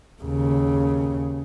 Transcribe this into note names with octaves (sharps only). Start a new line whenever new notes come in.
D#2 C#3